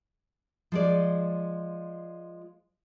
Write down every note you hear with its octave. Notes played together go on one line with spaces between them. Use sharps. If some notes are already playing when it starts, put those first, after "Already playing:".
F3 G#3 D5